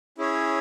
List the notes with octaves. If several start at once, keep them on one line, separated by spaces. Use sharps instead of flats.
C#4 E4 G#4 C#5